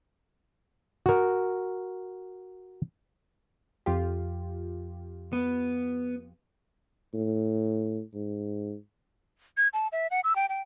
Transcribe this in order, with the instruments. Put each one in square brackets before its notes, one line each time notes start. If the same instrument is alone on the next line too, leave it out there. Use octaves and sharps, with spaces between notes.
[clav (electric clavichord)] F#4 A#4
[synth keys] F2 F4 G4
[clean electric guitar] B3
[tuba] A2
G#2
[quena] G#6
A5
E5
F#5
E6
G5
G5